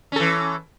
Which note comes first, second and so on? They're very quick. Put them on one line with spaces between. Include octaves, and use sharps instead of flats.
C#4 A4 E3